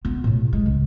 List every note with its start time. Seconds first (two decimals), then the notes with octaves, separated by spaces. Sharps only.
0.05 B3 F4
0.24 A2 C3
0.53 G#3
0.66 C#2